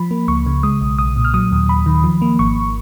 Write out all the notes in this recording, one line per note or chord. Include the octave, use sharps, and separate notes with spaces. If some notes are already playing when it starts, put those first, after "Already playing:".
Already playing: F3 B5
A#3
C#2 C#6
C#3
G#3 D#6
B1
B1 D#6
A#2
F6
F#3 D#6
D#2
D#2 B5
D#3
F3
A#3
G#1 C#6